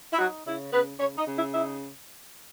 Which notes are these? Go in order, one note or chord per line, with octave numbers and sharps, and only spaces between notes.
E4
F#3 D#4 F#4
C#3 E4
C#3 B3 B4
C#3 C#4 C#5
D#4 D#5
C#3
E4 E5
D#4 E4 E5